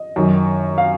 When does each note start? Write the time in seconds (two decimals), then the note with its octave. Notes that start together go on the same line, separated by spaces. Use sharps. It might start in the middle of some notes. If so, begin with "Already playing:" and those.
Already playing: D#5
0.16 F#2 D#3
0.78 F5